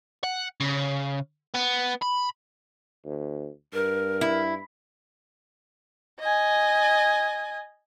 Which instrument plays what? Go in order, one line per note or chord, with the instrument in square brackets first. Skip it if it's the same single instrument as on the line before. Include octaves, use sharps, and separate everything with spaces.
[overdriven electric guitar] F#5
C#3
B3
B5
[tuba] D2
[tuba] G2 [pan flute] A#4
[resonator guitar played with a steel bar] E4
[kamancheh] D#5 G#5